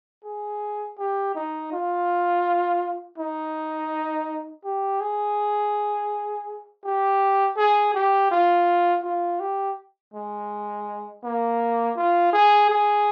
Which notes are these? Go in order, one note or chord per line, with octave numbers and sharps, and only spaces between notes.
G#4
G4
D#4
F4
D#4
G4
G#4
G4
G#4
G4
F4
F4
G4
G#3
A#3
F4
G#4
G#4